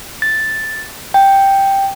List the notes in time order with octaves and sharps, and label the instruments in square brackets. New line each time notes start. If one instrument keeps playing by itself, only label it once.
[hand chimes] A6
G5